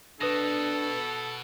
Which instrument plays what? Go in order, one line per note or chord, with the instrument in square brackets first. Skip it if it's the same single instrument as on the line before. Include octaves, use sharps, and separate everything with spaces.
[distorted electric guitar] B2 [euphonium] D4 [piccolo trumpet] A4 [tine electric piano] B4 D#6 A#6